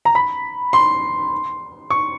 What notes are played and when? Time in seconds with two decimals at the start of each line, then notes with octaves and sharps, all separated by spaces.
0.05 A#5
0.15 B5
0.73 C6
1.90 C#6